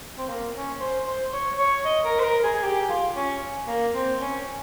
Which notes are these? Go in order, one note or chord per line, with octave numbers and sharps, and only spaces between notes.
C4
A#3
C#4
C5
C5
C#5
C#5
D#5
A#4
C5
A#4
G#4
G#4
G4
F4
C#4
A#3
C4
C#4